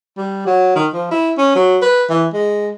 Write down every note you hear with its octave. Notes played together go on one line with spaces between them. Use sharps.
G3
F#3
D#3
F3
E4
C#4
F#3
B4
E3
G#3